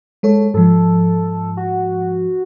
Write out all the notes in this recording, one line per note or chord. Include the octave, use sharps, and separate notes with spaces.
G#3 A4 C#5
G#2 F3 A4
F#4